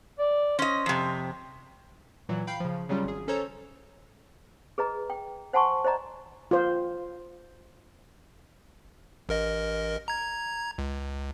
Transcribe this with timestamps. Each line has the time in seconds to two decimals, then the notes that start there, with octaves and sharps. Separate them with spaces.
0.19 D5
0.59 C#4 C5 D#5
0.86 F2 C3
2.29 A#2 E3 F#3
2.47 F5 G5 B5 G6 C7
2.60 C#3 F3
2.89 C#3 F#3 G3 C#4 F4
3.04 G#1 G#4
3.28 C#4 A4 C5 C#5 A#5
4.78 G#4 B4 D#5 A#5
5.10 G5
5.53 C5 F#5 G#5 A5 C6 C#6
5.85 C5 D5 D#5 A#5
6.51 F4 C5
9.29 A1 A#4 D#5
10.08 A#5 G#6
10.78 C#2